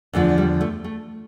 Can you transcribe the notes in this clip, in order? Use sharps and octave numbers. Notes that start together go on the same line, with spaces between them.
E2 D3 F3 A3
G3
A3
A3